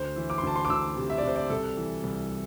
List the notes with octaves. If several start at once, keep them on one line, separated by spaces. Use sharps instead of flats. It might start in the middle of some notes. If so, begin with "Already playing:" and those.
Already playing: D2 C5
E3
D6
C6
D2 A5
C6
D6
D2 E6
C3
E5
D5
C3 C5
D5
C2 A4
E3
C2